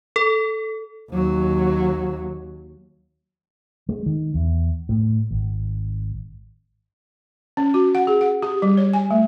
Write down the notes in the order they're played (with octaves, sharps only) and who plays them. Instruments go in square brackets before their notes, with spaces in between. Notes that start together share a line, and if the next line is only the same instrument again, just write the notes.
[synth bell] A4
[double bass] D#2 F#3
[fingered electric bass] G#3
D#3
E2
A2
G#1
[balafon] C#4
F#4
F#5
G#4
F#5
G4
G3
C#5
G#5
A3